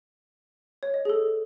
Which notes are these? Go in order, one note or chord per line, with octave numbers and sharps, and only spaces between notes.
C#5
D#5
G#4
A4